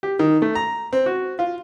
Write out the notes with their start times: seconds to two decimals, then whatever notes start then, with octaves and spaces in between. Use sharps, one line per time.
0.03 G4
0.19 D#3
0.42 A3
0.55 A#5
0.93 C4
1.06 F#4
1.39 F4